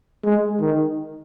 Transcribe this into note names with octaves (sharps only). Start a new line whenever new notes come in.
G#3
D#3